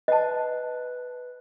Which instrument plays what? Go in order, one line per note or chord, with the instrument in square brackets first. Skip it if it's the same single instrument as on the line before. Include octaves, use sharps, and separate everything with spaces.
[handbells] B4 [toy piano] D#5 A5